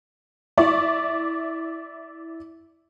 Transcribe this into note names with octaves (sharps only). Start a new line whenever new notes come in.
E4 D5 C#6